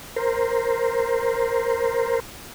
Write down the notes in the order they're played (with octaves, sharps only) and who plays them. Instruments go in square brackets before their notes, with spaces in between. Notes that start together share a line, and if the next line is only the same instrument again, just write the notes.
[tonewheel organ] A#4 C5